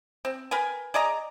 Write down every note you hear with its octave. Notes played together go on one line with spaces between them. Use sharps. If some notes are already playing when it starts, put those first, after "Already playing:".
C4
A#4 B4 G5 G#5
G#4 D5 D#5 A#5